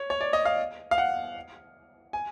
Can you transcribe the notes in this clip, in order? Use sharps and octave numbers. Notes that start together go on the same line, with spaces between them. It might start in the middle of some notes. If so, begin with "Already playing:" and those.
Already playing: C#5
C#5
D5
D#5
F5
F5
F#5
G#5